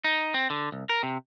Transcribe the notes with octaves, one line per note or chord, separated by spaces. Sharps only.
D#4
C4
D3
C2
A#4
C3